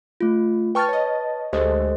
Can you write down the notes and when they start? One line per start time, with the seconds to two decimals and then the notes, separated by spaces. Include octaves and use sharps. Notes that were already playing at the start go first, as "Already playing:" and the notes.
0.21 A3 F4
0.75 B4 G5 A5 C#6 F6 A6
0.89 C#5 D#5
1.53 D2 G#3 G4 A4 C5 D#5